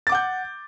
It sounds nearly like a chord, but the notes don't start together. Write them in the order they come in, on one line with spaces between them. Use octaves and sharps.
A6 D6 F#5 G6